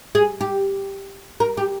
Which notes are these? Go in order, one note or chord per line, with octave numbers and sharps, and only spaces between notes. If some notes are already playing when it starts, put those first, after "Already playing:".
G#4
G4
A#4
G4